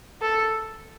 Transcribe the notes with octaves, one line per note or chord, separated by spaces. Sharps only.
A4